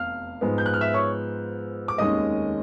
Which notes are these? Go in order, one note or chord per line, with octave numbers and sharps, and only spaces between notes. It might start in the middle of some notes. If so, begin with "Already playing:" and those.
Already playing: F1 E2 F5 F6
G#2 F3 G#3 B3
G6
F#6
F6
E5 E6
C#5 C#6
D6
F1 D#2 D#3 G#3 C#4 D#5 D#6